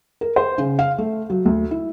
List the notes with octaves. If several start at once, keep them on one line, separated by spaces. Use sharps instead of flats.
A#4
C5
C#3
F5
A3
F#3
D2
E4